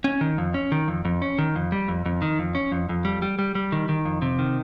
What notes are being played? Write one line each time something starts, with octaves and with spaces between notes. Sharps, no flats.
C#4
D#3
F2
C#4
D#3
F2
F2
C#4
D#3
F2
G3
F2
F2
D#3
F2
C#4
F2
F2
G3
G3
G3
G3
D#3
D#3
F2
C3
D#3